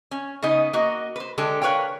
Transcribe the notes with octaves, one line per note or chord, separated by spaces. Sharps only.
C#4
C#3 B3 D#4 D#5
A#3 F#4 D#5
B4 C5
D3 G#3 G4 A4
A#4 B4 C#5 F5 G5